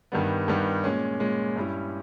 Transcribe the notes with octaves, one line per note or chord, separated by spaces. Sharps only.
G2 D#3 G3 B3
G2 D#3 G3 B3
A#2 G#3 C#4
A#2 G#3 C#4
G2 G3 C#4 E4